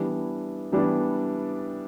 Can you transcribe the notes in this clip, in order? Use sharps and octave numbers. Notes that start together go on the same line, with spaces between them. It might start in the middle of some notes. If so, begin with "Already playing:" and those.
Already playing: E3 G3 B3 D4
E3 G3 B3 D4